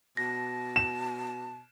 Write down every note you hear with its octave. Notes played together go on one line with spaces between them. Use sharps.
B2 A5 A#6
E7